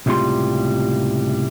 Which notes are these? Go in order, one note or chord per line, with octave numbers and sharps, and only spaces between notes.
C#2 A2 C3 G3 F4 C6